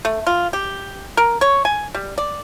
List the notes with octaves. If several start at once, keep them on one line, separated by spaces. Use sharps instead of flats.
A3
F4
G4
A#4
C#5
G#5
G3
D5